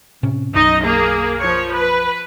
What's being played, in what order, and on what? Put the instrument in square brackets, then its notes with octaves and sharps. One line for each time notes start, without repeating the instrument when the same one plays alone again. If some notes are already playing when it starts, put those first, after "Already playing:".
[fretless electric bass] A2 C3 C#4
[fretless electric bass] B1 F#2 [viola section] D#4 D#5
[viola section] A#3 G#4
F3 C#5
B4